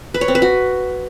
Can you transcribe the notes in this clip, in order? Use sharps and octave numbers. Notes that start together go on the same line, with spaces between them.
B4
C#5
C4
B4
F#4